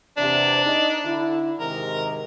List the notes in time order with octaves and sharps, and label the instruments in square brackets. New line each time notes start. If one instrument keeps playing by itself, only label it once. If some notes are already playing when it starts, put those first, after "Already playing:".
[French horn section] E2 C3 [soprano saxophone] D4
[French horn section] D#4
D3 E4
[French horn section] G#2 C3 D#3 [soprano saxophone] A#4